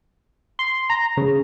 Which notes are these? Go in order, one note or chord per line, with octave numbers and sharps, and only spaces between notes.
C6
A#5
C#3